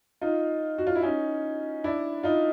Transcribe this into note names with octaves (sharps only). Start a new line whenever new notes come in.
D#4 F4
F#4
F4
E4
C#4 D#4
D4 E4
D#4 F4